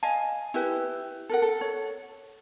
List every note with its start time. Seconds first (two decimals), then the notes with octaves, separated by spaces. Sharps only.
0.03 D#5 F5 G#5 A5
0.54 E4 G4 B4
1.29 A4 A#4 F#5
1.42 A4
1.61 C#5